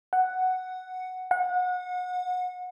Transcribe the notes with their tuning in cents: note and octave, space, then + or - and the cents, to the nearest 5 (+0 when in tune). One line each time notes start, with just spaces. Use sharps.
F#5 +5
F#5 -30